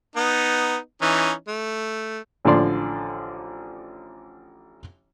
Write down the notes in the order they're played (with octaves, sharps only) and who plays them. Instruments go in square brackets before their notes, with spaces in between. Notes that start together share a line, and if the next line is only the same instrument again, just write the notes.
[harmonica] B3 D#4
E3 C#4 D#4
A3
[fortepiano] A1 D3 F3 D5 C6